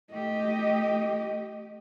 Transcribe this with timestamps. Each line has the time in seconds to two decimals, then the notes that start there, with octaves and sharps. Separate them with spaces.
0.13 A3 G4 D#5